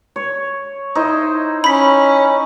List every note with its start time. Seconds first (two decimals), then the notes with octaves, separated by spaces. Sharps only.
0.16 C#5
0.95 D#4 E4 C5
1.64 C#4 B5 B6